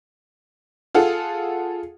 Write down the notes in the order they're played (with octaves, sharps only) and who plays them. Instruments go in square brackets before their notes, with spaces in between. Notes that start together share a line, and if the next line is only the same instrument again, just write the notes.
[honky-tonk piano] F4 G#4 A4 F#5